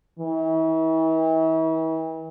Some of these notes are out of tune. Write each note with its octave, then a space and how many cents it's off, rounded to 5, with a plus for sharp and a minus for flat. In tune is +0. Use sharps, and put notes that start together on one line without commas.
E3 -40